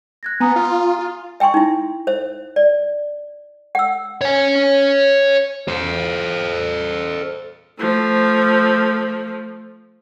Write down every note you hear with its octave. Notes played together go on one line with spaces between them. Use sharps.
F#6 G#6 A#6
B3 G#5 A#5 D#6
F4
F4
E5 G5 G#5 C6 C#6
D#4 E4
C5 E5
D5
F#5 E6
C#5 G#5
A4 C5
F3 A3